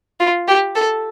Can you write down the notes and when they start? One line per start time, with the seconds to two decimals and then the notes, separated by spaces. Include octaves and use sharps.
0.20 F4
0.48 G4
0.75 A4